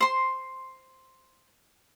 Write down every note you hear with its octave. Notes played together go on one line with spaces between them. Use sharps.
C5 C6